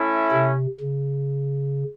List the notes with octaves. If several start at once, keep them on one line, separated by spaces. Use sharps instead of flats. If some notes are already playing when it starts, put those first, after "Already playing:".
Already playing: A3 C#4 E4
C3
C#3